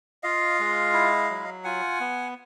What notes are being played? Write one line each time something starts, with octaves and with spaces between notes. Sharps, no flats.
F4 D#5 F5
G#3
E4
F#3
F4 F#5 G#5
B3